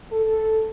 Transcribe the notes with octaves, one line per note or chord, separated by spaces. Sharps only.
A4